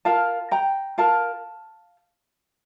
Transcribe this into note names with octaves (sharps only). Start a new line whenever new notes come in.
F4 A#4 F5 A5
G5 A#5
F4 A#4 F5 A5